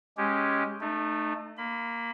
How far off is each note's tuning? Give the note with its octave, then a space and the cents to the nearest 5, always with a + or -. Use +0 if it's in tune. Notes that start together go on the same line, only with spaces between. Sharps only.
G#3 +0 C#4 +0 G4 -5
A3 +0 D#4 -35
A#3 +0 B5 +30